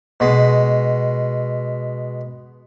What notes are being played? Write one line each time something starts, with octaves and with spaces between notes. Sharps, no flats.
B2 G#3